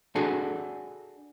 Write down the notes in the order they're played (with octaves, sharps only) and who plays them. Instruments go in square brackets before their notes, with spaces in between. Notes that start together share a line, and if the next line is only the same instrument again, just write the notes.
[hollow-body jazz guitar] D4 F#4 G#4 A4